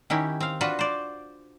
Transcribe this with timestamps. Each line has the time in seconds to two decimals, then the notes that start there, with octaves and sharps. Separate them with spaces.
0.10 D#3 C#4 E4 G4
0.40 C4 F5
0.61 D4 F4 F#4 B4
0.79 C5 D5